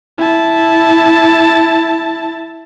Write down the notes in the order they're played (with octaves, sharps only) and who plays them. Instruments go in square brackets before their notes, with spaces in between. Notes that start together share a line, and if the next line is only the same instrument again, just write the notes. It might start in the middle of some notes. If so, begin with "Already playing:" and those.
[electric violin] E4 A5